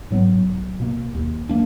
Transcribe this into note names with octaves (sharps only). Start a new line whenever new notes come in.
G#2 F#3 B3
B1
B2 A#3
D#2
A#3 D4